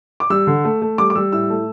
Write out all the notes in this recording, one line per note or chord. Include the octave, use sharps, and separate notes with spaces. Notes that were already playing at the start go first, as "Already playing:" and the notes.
D6
G3 E6
D3
A3
A3
G3 D6
D6
G3 E6
A2 E6
A3